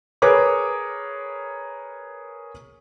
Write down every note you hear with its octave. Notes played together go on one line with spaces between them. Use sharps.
G#4 A#4 B4 C#5 D6